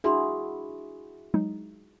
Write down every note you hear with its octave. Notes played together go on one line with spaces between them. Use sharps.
D4 E4 F#4 G#4 B5 C6
F#3 G#3 D#4